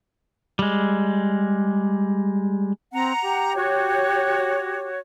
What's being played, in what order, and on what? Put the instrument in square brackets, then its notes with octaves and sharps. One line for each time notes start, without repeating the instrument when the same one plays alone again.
[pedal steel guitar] G3 G#3
[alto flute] C4 [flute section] F#5 A#5
[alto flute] G4
[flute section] F#4 C#5